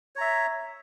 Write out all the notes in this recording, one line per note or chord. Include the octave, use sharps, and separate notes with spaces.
C#5 E5 A#5